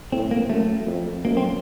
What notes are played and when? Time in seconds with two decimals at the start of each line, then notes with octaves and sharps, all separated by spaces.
0.12 A2 C4
0.31 A#3
0.50 F#2 A3
0.87 F2
1.25 F#2 A#3
1.37 C4